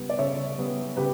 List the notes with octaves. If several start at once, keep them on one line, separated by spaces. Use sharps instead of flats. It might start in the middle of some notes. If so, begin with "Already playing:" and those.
Already playing: C#3 G3 B3
D5
C#3 C#5 E5
G3 B3
C#3 G4 B4